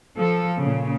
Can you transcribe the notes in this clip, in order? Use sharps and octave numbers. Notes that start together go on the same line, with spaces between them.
F3 A4
A#2 C#3